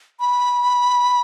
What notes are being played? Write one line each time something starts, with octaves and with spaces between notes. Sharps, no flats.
B5